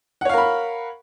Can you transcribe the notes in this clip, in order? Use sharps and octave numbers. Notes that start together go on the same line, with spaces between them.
A#4 C#5 F5 F#5 B5